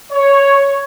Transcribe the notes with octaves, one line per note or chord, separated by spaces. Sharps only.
C#5